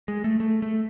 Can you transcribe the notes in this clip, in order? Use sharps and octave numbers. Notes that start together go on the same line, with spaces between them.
G#3
A3
A3
A3